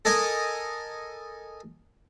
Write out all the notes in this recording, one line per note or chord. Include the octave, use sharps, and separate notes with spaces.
A4 A#4 D#5 G#5 A#5